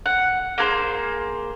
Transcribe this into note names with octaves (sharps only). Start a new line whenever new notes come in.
F#5
A#3 G#4 A#4 C5